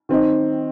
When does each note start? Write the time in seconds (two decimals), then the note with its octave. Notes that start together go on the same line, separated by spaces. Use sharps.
0.09 D#3 C4 D#4